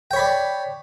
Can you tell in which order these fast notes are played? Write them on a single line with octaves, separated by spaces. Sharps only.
G5 C#5 B5 D5